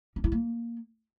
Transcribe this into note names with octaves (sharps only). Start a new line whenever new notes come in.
C#4
E4
A#3